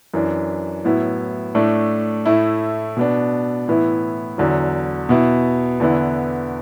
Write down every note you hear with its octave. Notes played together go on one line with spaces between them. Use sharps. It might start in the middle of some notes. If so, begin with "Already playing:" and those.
F#2 E3 D4
A2 F#3 B3 E4
A2 A3 D4
A2 A3 E4
B2 B3 D4
A2 E3 B3 E4
E2 D3 F#3
B2 B3 E4
E2 D3 B3 E4